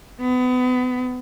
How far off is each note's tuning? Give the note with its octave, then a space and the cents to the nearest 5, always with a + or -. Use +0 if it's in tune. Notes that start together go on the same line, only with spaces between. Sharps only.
B3 +30